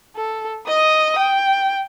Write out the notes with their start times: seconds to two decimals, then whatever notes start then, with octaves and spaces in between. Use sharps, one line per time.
0.16 A4
0.67 D#5 D#6
1.18 G5